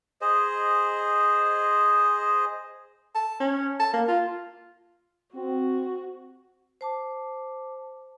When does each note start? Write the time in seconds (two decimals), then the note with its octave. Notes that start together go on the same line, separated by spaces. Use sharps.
0.21 G#4 C5 D#5
3.15 A5
3.40 C#4
3.80 A5
3.93 A#3
4.08 F4
5.35 C4 F#4
6.81 C5 A5 D6